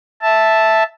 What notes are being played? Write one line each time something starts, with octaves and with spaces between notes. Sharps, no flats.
E5 A5